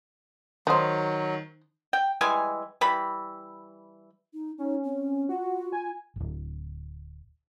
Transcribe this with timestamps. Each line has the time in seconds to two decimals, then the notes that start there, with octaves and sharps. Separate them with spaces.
0.67 D#3 F#3 D#4 C5
1.93 G5
2.21 E3 G3 G#3 G#5
2.81 E3 G3 B5
4.33 D#4
4.58 C#4 D#4
4.84 C4
5.29 F4 F#4
5.73 G#5
6.16 D1 G1